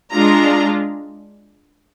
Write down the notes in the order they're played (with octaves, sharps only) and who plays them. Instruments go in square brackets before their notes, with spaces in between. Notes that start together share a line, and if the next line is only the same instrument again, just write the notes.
[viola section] G#3 D4 F4 A#5